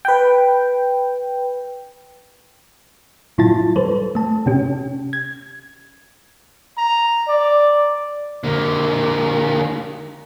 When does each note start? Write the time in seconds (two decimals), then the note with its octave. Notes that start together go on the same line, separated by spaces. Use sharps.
0.05 B4 G5
3.38 A2 F#3 E4 F4 A5 A6
3.76 G3 A4 B4 C5
4.15 A3 A5
4.46 C3 C#4 G4
5.13 G#6
6.78 A#5
7.28 D5
8.44 D3 A#3